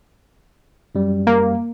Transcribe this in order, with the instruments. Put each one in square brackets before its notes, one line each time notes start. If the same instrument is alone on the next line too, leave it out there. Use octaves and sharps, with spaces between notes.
[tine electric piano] F#2 G3
[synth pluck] A#3